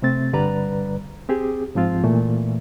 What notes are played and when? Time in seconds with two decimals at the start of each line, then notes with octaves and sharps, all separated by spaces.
0.02 C3 A3 C4 A6
0.33 G2 D3 G3 B4 D5 A#5
1.29 C4 G4 G#4
1.75 G#2 F3 C4 F4
2.04 A#2 E3 A3